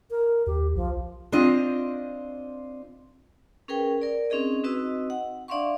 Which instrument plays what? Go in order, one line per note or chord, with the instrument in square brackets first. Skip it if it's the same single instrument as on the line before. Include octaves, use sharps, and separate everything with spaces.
[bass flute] A#4
[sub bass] D#2 [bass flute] G4
[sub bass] B1 [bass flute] F3
[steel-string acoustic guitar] C4 D4 F4 C5 D#5
[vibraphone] C#4 G#4 A#4 B4 G5
A#4 D5
C4 C#4 D#4 G#4 D#5
C4 D#4 F#4 B4 D#5 E6
F#5
D4 D5 E5 F5 C6 C#6